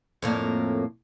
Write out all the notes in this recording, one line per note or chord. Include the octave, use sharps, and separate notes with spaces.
F2 A2 A#3